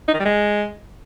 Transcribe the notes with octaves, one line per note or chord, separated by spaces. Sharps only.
D#4
D#3
G3
G#3